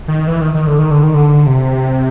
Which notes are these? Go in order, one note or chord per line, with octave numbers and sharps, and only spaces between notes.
D#3
E3
D#3
D#3
D3
D#3
D3
D#3
D3
C3